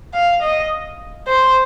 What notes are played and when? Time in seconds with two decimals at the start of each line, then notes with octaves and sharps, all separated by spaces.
0.14 F5
0.43 D#5
1.28 C5